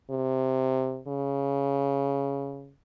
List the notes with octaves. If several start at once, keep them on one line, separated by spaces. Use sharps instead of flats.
C3
C#3